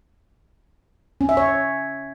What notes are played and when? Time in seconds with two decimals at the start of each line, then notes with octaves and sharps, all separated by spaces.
1.21 C#4
1.29 E5
1.37 C#5